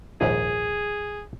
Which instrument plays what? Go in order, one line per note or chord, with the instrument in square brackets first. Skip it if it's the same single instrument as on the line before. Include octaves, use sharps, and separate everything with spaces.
[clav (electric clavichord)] A#1 D#2 G#2 [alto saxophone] G#4